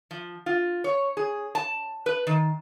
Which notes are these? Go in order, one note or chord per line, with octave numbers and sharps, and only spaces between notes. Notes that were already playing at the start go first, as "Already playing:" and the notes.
F3
F4
C#5
G#4
A5
B4
D#3